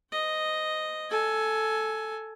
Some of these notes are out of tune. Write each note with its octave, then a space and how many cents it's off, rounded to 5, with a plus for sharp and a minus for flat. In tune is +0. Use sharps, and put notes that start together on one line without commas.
C5 -20 D#5 +0
A4 +0 G#5 +15